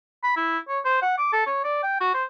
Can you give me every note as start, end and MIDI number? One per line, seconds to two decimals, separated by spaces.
0.24 0.33 83
0.36 0.58 64
0.68 0.80 73
0.85 0.98 72
1.02 1.13 78
1.18 1.30 86
1.33 1.43 69
1.46 1.60 73
1.64 1.80 74
1.83 1.97 79
2.01 2.13 66
2.14 2.24 72